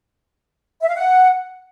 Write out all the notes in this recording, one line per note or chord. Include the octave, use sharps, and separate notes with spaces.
E5
F5
F#5